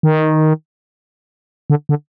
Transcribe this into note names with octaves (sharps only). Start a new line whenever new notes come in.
D#3
D3
D3